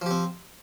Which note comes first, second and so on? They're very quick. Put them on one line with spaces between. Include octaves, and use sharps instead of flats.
F3 G4 C4